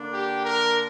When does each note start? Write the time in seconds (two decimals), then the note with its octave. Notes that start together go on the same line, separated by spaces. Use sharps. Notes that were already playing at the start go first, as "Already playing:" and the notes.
Already playing: D3 A#3 D4
0.12 G4
0.44 A#4